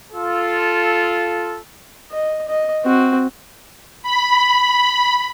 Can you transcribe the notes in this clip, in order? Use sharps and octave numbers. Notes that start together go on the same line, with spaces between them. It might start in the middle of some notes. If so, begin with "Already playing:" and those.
F4 A4
D#5
D#5
C4 F#4
B5